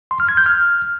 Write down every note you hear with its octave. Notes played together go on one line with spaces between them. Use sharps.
C6
F6
G#6
G6
F6